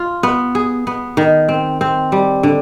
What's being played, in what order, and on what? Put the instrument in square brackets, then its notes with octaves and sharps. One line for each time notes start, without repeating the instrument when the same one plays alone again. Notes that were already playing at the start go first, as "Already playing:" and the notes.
Already playing: [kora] F4
B3
G#4
B3
D#3
C4
C4
G3
D3